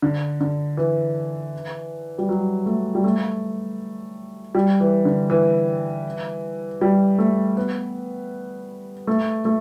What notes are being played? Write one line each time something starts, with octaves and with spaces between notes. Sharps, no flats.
D3
D3
E3
G3
F#3
A3
G3
A3
G3
E3
D3
E3
G3
A3
B3
A3
A3